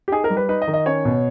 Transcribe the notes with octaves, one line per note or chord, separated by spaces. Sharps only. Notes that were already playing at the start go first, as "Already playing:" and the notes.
G4
D#4 G#4
A#4
G3
B4
D#4 B4
D#5
D#3
D#5
C#4 C#5
B2